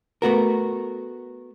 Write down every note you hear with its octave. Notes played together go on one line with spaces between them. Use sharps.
A3 B3 F#4 A#4